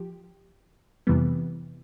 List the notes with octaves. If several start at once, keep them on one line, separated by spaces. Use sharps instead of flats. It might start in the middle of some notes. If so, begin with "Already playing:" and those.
Already playing: F3 G4
F2 C3 E3 G3 B3